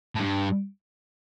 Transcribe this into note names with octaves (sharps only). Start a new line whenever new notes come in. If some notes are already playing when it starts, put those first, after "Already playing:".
A2
G2